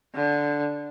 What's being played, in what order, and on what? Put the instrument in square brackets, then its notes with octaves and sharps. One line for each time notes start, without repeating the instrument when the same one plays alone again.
[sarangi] D3